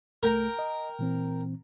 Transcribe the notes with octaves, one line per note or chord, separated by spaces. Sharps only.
C2 A3 A#4 G5 A#5
D#5
A#2 E3 C4